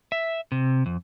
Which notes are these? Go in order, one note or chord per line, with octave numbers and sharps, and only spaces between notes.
E5
C3
F2